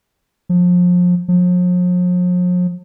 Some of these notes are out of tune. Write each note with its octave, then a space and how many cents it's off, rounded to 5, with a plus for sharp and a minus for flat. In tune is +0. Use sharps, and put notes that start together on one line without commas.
F3 +30
F3 +45